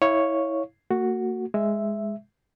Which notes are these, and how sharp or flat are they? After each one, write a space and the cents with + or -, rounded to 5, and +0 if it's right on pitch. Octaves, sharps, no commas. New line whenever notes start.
E4 -20 C#5 +0 F5 +0
A#3 -45 F#4 +0
G#3 +0 E5 +0